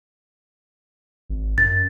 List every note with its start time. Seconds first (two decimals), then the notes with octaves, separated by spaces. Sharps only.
1.30 G#1
1.58 F#2 A6